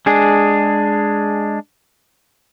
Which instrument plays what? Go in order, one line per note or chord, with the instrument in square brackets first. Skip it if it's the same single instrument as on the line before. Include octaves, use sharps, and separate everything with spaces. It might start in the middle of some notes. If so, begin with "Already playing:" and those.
[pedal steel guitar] G#3 D4 G#4